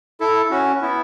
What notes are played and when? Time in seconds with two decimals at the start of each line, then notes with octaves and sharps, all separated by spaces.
0.20 E4 A4
0.50 C#4 F#4
0.82 B3 E4